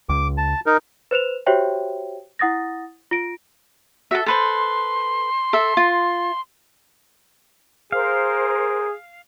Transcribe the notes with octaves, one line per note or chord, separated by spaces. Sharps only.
C#2 D6
A5
D#4 A#4
B4 C5 E7 F7
F#4 G4 C5 C#5 E5 G5
E4 F#5 D#6 A6 A#6
F4 A#6 D7
F#4 A4 E5
A4 B4 C5 C6
A4 E5
F4
G#4 A#4 C5 F5